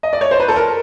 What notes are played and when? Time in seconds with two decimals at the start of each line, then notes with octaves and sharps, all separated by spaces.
0.03 D#5
0.13 D5
0.21 C#5
0.31 C5
0.40 B4
0.48 A4
0.56 A#4